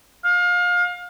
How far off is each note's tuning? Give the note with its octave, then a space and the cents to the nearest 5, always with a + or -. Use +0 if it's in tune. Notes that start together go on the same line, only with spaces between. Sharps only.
F5 +30